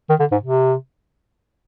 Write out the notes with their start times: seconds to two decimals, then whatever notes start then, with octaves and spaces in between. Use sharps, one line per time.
0.09 D#3
0.20 D3
0.32 G#2
0.43 C3